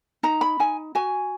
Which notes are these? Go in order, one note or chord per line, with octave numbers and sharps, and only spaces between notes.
D#4 A#5
B5
D#4 G#5
F#4 G#5